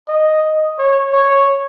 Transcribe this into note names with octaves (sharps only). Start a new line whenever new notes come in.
D#5
C#5
C#5